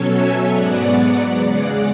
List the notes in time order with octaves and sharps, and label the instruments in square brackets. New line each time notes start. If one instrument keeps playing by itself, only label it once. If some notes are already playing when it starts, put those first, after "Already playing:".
Already playing: [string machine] B2 F#3 C#4 A4 C#5
E5 G#5
G#2 F#3 B3 D5 F#5
E2 C#3 G#3 D5 F#5